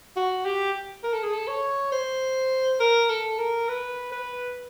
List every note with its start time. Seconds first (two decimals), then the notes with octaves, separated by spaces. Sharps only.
0.16 F#4
0.45 G4
1.03 A#4
1.13 A4
1.23 G#4
1.32 A4
1.47 C#5
1.92 C5
2.80 A#4
3.10 A4
3.39 A#4
3.68 B4
4.12 B4